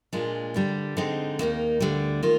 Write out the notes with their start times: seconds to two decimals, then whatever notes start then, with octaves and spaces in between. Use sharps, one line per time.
0.13 A#2 G#3 D4 F4
0.54 G2 D3 G3 D4
0.97 D3 G#3 C4 D#4
1.39 D#2 D#3 A#3 D#4
1.80 D2 D3 G3
2.23 D#3 A#3 F4